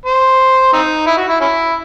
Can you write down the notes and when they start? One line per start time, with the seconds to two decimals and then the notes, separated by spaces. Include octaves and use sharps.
0.06 C5
0.73 C4 D#4
1.06 E4
1.17 F#4
1.28 E4
1.41 C#4 E4